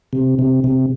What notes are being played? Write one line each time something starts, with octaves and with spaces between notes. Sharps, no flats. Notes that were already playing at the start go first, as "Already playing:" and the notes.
C3
C3
C3